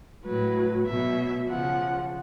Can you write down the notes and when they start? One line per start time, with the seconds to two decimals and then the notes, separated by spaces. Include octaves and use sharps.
0.25 A2 F#3 B4
0.87 B2 F#3 E5
1.50 C#3 F3 F#5